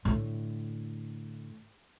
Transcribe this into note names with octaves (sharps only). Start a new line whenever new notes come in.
A2 D3